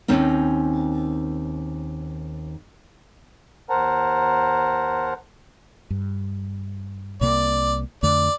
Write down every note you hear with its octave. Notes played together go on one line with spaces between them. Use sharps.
D#2 C4 C#4 D#4
D#2 A#4 C5 F#5 A5 A#5
G2
C2 C3 A#3 D5
F2 D3 A3 D5